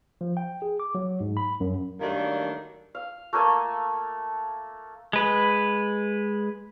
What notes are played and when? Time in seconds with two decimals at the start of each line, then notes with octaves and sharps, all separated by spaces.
0.21 F3
0.37 G5
0.62 G#4
0.80 D6
0.95 F#3
1.20 G#2
1.37 B5
1.60 F#2
2.01 D#3 F#3 G3 A3 A#3 D4
2.95 F5
3.33 A3 A#3 A4 G#5
5.13 G#3 B4